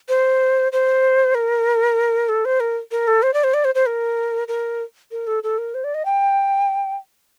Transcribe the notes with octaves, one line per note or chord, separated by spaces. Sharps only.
C5
C5
A#4
A4
C5
A#4
A#4
A4
C5
D5
C5
D5
C5
C5
A#4
A#4
A#4
A4
A4
A#4
C5
D5
D#5
G5